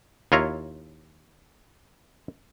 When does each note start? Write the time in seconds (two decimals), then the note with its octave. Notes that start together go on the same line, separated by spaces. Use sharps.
0.32 D#2 E4 F4 C#5 A#5